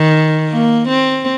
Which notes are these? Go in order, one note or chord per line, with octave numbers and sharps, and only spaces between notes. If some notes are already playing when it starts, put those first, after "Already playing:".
Already playing: D#3
A#3
C4